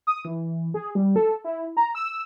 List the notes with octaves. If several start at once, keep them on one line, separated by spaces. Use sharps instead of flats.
D#6
E3
G#4
G3
A4
E4
A#5
E6